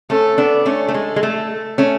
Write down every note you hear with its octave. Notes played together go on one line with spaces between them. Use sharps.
A3 C#4 A4
B3 D4
A3 C#4 A4
A3
G#3
G#3
A3
A3 C#4